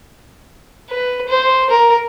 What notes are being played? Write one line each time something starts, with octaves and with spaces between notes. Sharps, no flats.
B4
C5
A#4